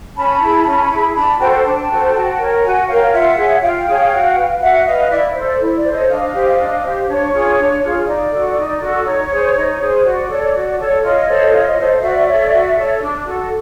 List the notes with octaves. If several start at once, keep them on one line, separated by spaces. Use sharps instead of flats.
C#4 A5 B5
E4 G#4
C#4
E4 G#4
D4 A5 B5
F#4 A4 C5 G5 A5
D4 G5 A5
F#4 A4 C5
F#4
A#4 C#5
F#4 F#5 G#5
A#4 C#5 F5 G5
F4 E5 F#5
G#4 C#5
F4 F5 G5
G#4 C#5
F#4
B4
F#4 E5 F#5
B4 D#5 F5
E4 D5 E5
A4 C5
D5
E4
D5
A4 C5
C#5 D#5
D4 D#5 F5
G4 C5
D4
G4 C5
D4 C#5
F4 G#4
D4
F4 G#4
D#4 D5
F#4 A4
D#4
F#4 A4
D#4 C#5
G#4 C5
D#4
G#4 C5
F#4 D5
A4 C#5
F#4
A4 C#5
F4 C#5 D#5
A4 C5
F4
A4 C5
F#4 D5 E5
A4 C#5
F#4
A4 C#5
D4
F#4 A4